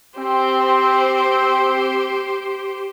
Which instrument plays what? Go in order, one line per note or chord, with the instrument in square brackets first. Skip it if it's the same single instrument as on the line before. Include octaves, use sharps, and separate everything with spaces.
[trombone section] C4 [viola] G4 C5